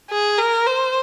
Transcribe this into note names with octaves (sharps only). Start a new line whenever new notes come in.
G#4
A#4
C5